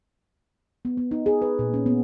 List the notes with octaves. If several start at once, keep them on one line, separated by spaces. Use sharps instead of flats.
B3
B3
D#4
G#4
B4
A#2
C#4
B3